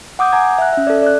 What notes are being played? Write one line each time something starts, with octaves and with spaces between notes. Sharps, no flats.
F#5 D6 D#6 G6
F#5 G#5 A#5 G#6
E5 F#6
C#4 E5
A4 D5
D5 F#6